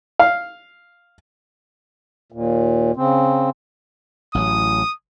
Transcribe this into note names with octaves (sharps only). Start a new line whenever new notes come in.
F5
D#2 A#2
C#3 C4
A1 A2 F#3 D#6